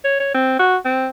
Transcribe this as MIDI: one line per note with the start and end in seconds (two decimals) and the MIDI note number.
0.04 0.19 73
0.20 0.31 73
0.34 0.55 60
0.59 0.76 66
0.85 1.08 60